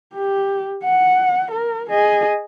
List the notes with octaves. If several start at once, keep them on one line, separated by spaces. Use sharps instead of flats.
G4
F#5
A#4
G#4 D#5